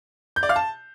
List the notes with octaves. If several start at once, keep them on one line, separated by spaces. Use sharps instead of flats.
G6
D5
F5
A5